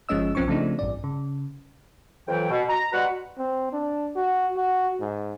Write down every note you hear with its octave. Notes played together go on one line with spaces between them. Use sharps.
G1 F3 G#3 C#4 D#5 E6
B1 F3 C4 C#4 C#6
C#3 F3 A3 C4 D4 D#4
A1 G2 D5
C#3
F2 E3 F#3 G5
B2
A#5
G3 G#3 F#4 B4 F#5
C4
D4
F#4
F#4
G#2